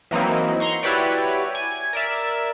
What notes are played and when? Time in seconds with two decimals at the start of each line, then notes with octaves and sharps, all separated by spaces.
0.11 E3 F#3 A#3 C4 D#4 E4
0.60 A#5 C6 C#6
0.83 E4 F#4 G4 B4 C#5 D5
1.55 G#5
1.93 A#4 D5 E5